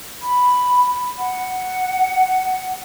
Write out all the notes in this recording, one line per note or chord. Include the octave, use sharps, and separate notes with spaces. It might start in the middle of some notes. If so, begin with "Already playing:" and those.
B5
F#5